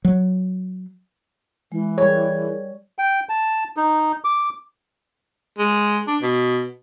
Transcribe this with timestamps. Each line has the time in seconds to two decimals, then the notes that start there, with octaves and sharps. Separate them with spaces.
0.05 F#3
1.72 E3 G#3
1.98 G3 G#4 A#4 C#5
2.98 G5
3.29 A5
3.77 D#4
4.25 D6
5.59 G#3
6.08 D4
6.22 B2